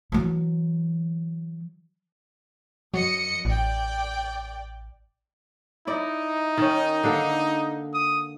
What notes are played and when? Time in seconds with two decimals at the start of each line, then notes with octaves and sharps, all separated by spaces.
0.12 E3 F#3
2.94 F#2 F#3 D#5 C#7
3.45 A1 D5 G5
5.87 D#4 E4 D5
6.57 D#3 C#4
7.03 D3 A#3 A4
7.94 D#6